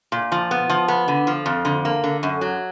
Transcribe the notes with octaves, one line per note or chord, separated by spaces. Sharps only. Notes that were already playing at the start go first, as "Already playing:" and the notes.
A#2
F3
B3
F3
B3
D3
F3
F2
D3
A#3
D3
F#2
F#3